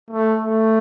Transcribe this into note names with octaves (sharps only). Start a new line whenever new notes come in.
A3
A3